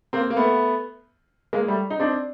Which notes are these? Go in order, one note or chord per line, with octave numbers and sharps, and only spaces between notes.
A#3 C4
A#3
A3 B3
G#3 A#3
G3 A3
D#4
C4 D4